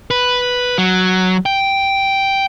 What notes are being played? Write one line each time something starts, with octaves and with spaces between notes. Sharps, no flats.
B4
F#3
G5